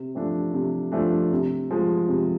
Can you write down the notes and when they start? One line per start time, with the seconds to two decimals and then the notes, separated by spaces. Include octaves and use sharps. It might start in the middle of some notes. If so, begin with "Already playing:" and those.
Already playing: C3
0.15 F3 A3 D4
0.54 C3
0.92 F3 A3 D4
1.32 C3
1.70 F3 G#3
2.09 C3